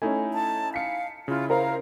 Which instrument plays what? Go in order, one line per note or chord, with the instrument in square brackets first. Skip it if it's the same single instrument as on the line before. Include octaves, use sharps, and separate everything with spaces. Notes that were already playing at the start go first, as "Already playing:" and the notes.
[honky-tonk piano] A3 C#4 [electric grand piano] D#4 E4 G#5
[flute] A5
[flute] F5 [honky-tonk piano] B6 C#7
[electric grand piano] C#3 E4 [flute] F4
[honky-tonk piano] A#4 C5 A#5 [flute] F5